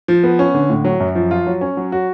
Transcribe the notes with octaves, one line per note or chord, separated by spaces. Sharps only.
F3
B3
C#4
D3
A2
F#3
F#2
F3
F4
F#3
C#4
F#3
F#4